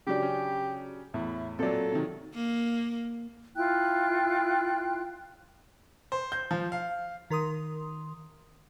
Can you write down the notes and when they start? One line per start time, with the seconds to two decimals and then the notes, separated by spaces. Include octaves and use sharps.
0.07 C#3 F#3 D4 G4
0.22 C#4
1.14 E2 A2 E4
1.59 A#2 F#3 C4 A4 D5
1.92 C3 D#3
2.35 A#3
3.56 E4 F4 G5 F#6
6.12 C5
6.32 G6
6.51 F3
6.72 F5
7.30 D#3 A#4 C6 D#6